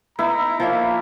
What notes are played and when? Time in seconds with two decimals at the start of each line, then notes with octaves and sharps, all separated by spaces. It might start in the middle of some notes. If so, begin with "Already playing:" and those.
0.19 B3 D#4 E4 A#5
0.60 F3 A#3 C#5 E5